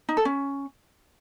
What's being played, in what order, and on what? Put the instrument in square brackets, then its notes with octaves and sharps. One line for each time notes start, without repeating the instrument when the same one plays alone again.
[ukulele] D#4
A4
C#4